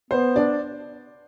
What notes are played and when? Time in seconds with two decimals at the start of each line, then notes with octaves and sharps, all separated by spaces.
0.11 B3 C5
0.36 D4 D5